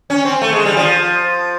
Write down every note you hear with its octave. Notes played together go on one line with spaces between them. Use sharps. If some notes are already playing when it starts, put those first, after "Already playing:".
C#4
C4
A3
G#3
G3
F3